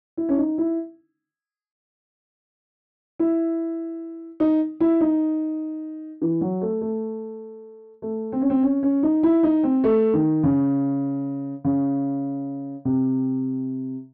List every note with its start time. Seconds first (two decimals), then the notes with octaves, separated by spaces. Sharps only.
0.17 E4
0.29 C#4
0.38 D#4
0.58 E4
3.19 E4
4.40 D#4
4.80 E4
5.01 D#4
6.22 E3
6.41 F#3
6.61 A3
6.81 A3
8.02 A3
8.32 C4
8.41 C#4
8.50 C4
8.63 C#4
8.83 C#4
9.03 D#4
9.23 E4
9.43 D#4
9.63 C4
9.84 A3
10.14 D#3
10.44 C#3
11.65 C#3
12.85 C3